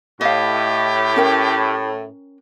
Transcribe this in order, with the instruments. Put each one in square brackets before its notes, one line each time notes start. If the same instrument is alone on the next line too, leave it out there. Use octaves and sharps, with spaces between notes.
[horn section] A2 [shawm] G4 [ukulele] D#5 F5
[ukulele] C#4 A#4 G5